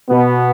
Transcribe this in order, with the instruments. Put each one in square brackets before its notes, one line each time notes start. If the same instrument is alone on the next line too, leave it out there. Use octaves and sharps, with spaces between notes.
[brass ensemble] B2 B3